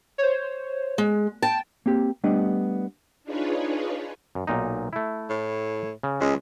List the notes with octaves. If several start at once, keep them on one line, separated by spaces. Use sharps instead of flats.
C5 C#5
G#3
G5 A5
A#3 C4 G4
G3 A3 B3 D4 G4 D#5
D4 D#4 F4 G#4 B4 C#5
F#2
B1 A#2 D#4
A3 E4
A2
C#3
C#2 G#3 C#4